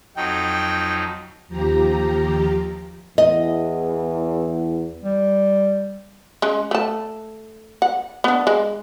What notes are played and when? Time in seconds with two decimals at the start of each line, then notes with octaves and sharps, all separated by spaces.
0.17 F2 F#3 D#4 G5
1.48 D#2 F3 G4 A#5
3.18 E2 D#5
5.03 G3
6.42 G#3 C#4
6.71 A3 A5
7.82 F#5
8.24 B3 D4
8.47 G#3